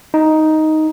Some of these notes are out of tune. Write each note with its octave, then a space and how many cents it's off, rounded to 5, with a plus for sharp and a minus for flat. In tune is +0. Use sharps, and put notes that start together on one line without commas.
D#4 +5